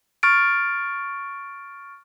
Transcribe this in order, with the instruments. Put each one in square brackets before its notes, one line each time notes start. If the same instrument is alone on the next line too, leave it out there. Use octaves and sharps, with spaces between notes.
[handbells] C#6 F6 A6 D7